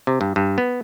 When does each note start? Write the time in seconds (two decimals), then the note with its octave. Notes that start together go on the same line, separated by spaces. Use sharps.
0.07 C3
0.21 G2
0.36 G2
0.58 B3